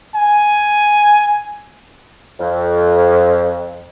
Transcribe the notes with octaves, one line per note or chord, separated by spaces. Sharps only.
G#5
F2